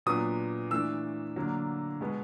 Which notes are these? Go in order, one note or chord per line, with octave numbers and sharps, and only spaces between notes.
A#2 F#3 B3 D4 D#6
E3 A3 D4 E6
D3 F#3 A#3 D4
B2 G#3 B3